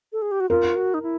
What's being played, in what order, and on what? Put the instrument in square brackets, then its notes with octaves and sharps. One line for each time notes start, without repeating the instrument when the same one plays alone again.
[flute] A4
G#4
G4
F#4
[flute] F4 [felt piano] A#4
[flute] F#4
D#4
E4